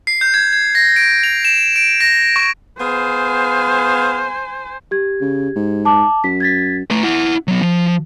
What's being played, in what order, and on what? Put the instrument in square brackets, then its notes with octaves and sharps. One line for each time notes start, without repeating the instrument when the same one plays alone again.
[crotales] C7
G6
G#6
G#6
A#6
D7
F7
E7
D7
A#6
C#6
[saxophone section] B3 G#4 F5 [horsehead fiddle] C5 G#5
[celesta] G4 G#6
[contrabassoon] C#3
G#2
[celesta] A5 D6
[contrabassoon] F#2 [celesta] B6
[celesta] G#6 A6 B6
[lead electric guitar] A3 B4
E4 F#5
F#3 B3
F3